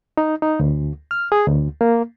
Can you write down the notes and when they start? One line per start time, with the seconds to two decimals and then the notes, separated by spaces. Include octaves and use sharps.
0.17 D#4
0.42 D#4
0.60 D2
1.11 F6
1.32 G#4
1.46 D2
1.81 A#3